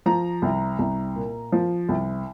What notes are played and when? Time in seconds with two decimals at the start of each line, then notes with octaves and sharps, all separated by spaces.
0.06 F3 A#5
0.42 C2
0.79 C2
1.16 A#2
1.52 F3
1.89 C2